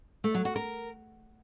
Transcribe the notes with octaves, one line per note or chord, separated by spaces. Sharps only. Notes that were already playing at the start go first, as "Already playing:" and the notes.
A3
F#3
F#4
A#4